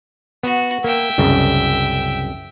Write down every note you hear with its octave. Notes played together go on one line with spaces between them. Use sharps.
B3 F#4
A#3 E5 G5
C2 F#2 C#3